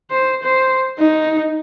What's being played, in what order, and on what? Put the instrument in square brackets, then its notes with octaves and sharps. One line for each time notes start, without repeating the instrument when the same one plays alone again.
[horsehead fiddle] C5
C5
D#4